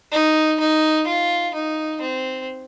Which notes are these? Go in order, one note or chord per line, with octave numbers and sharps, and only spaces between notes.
D#4
D#4
F4
D#4
C4